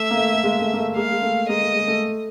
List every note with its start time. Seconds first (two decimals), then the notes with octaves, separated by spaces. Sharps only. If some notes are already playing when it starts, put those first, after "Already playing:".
Already playing: A3 E5
0.10 A#3
0.17 A3
0.33 A3
0.43 G#3 A#3
0.61 A3
0.73 A#3
0.78 A3
0.96 G#3 A#3 F5
1.12 G#3
1.22 A3
1.49 G#3 A#3 D#5
1.62 A3
1.75 G#3
1.88 A3